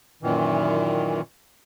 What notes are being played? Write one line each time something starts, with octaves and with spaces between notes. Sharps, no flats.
F#2 A#2 D#3 E3